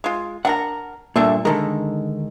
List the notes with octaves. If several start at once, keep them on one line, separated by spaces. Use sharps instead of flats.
G#3 F4
D4 A#4 F#5 A#5
G2 A#2 A3 D4 E5
D3 D#3 G#3 A4 A#4